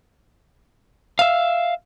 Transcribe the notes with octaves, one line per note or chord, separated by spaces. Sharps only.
E5 F5